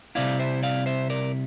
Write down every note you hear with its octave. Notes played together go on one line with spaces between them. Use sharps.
C3 G3 C4 E4 D5 F5
C5 E5
D5 F5
C5 E5
A#4 D5